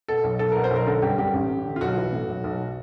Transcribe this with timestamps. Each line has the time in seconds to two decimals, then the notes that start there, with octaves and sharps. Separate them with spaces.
0.08 B2 A4
0.24 B1
0.39 B1 A4
0.52 B2 A#4
0.64 C5
0.71 B1 A#4
0.87 D3 A4
1.02 G2 G4
1.18 G2 G4
1.33 A1
1.50 A1
1.65 D3
1.76 F4
1.81 B1 F#4
1.97 E3
2.12 A2
2.29 B1
2.44 B1